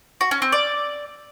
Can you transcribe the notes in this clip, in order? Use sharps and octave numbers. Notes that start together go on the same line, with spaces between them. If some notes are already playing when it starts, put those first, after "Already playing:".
F#4
C#4
C4
D5